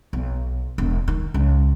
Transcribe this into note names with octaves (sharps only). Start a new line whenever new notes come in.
B1
E1
D#3
C#2